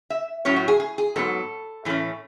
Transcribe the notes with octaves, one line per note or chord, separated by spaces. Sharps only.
E5
A2 F#3 A3 C#4 C#5
F#4
G#4
G#4
G#4
G#2 F#3 B3 A4
A2 E3 A3 C#4